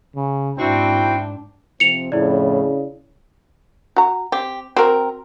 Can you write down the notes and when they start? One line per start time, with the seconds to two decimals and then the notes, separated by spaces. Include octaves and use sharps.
0.15 C#3
0.59 G#2 C4 D4 E4 F#4 G5
1.80 C3 F3 C4 C#7 F7
2.12 F2 A2 C#3 E4 D5
3.96 F#4 A#5
4.32 C4 G4
4.76 C4 F#4 A#4